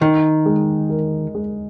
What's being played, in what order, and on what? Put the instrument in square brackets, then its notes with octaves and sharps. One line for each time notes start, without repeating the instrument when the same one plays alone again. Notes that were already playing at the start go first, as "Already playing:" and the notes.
[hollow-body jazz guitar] D#3 [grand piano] D#4
[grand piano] G#3
A#4
G#3